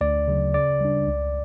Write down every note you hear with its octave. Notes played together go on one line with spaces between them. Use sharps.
D2 D5
C#3 F#3
C#3 D5
G3 D4
C#2